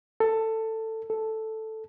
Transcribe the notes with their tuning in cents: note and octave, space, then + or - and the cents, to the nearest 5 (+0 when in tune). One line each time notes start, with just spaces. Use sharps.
A4 +15
A4 +0